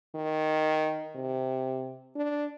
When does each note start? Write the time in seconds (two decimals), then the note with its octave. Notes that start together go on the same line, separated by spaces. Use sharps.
0.15 D#3
1.15 C3
2.16 D4